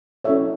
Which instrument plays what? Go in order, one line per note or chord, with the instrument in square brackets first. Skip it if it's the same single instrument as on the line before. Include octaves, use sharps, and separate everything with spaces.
[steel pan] C#4 E4 A4 C#5 E5